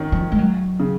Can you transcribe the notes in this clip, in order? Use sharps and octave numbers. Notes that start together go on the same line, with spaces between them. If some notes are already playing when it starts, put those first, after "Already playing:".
Already playing: D#3 C#4
F3
G#3
F#3
C#3